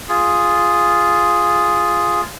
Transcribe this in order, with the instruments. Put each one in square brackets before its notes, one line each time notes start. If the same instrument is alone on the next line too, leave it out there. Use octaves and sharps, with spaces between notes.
[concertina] F4 G#4